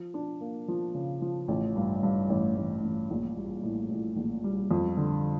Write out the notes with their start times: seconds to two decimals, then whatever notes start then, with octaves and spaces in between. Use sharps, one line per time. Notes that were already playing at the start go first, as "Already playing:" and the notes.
Already playing: F3
0.14 D4
0.41 A#3
0.68 F3
0.95 C#3
1.22 F3
1.48 A1
1.76 G2
2.03 G2
2.29 A1
2.57 A1
2.83 A1
3.10 A#1
3.37 G3
3.63 A2
3.91 A2
4.16 A#1
4.44 G3
4.71 F2
4.97 D3